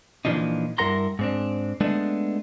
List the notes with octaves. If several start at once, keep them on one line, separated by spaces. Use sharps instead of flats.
A#2 E3 F3 D4 D#4
G2 E4 A#4 F#5 A#5 C6
G#2 C4 D4
G#3 A3 B3 D4